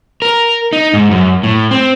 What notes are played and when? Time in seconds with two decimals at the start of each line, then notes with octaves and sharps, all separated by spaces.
0.22 A#4
0.73 D#4
0.94 G#2
1.11 F#2
1.43 A2
1.71 C4